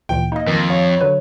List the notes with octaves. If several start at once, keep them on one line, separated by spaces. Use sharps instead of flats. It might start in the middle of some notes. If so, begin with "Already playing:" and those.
D2 A#2 E3 G5
A#3 D#4 D#5
F2 D#3
C#5 F5
D3 F#3 B4